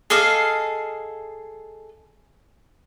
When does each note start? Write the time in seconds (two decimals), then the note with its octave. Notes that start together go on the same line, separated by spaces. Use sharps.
0.10 G#4 A4 D#5 F5